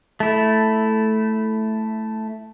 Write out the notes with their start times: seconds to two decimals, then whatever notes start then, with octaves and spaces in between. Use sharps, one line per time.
0.20 A3 E4